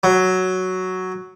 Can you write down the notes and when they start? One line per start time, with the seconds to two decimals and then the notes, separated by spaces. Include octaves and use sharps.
0.03 F#3